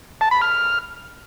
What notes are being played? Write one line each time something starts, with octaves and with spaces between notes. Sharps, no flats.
A5
B5
F6